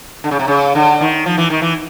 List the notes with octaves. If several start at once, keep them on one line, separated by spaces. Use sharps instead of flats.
D3
C#3
C3
C#3
D3
D#3
F3
E3
D#3
E3